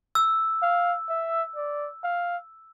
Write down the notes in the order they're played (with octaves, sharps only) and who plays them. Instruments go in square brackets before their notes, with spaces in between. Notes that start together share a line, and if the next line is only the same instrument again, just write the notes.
[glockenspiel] E6
[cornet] F5
E5
D5
F5